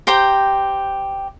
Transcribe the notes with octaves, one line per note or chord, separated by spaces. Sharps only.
G4 C5 G5 A#5